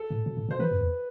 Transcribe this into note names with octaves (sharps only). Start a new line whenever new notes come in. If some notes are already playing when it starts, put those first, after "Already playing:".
Already playing: A4
A2
B2
A2
B2 C5
E3 B4
F#2
E2